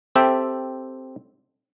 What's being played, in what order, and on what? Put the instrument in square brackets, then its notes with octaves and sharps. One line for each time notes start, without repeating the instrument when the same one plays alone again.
[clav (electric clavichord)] C4 G4 A4 E5 G5